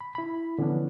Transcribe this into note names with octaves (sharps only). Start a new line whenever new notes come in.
B5
E4 B5
D3 E3 F3 B3 C#4 D4